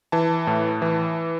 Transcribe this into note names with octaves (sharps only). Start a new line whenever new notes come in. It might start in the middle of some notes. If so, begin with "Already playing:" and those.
E3 A5
A2
E3